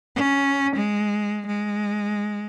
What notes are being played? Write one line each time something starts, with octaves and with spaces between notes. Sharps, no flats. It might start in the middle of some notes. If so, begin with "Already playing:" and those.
C#4
G#3
G#3